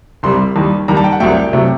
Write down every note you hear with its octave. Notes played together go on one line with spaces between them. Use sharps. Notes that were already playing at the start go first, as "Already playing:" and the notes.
C2 C3 G3 C6
D#2 D#3 G3
D#2 D#3 G3 A#5
A5
G5
F#5
C2 C3 F#3 A3 G5
C3 F#3 A3